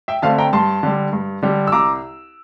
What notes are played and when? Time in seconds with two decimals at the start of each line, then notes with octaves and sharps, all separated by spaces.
0.08 E5 G5
0.22 D3 A3 C4 F5 A5
0.39 G5 A#5
0.53 G2 A5 C6
0.83 D3 G3
1.13 G2
1.43 D3 G3
1.67 E6
1.72 C2 A#5 D6